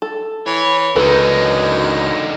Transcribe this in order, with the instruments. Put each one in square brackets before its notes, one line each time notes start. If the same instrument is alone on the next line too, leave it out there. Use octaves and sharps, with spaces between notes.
[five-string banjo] A4
[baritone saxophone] E3 [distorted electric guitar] C#5
[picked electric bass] C#2 [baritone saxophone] F#2 [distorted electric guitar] D3 D#4 [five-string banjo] A4 B4